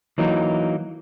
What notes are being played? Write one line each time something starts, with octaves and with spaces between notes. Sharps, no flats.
E3 F#3 A#3 D#4